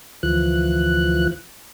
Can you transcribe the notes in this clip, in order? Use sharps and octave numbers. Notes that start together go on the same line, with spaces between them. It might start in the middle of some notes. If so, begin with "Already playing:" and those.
D2 E3 F3 F#6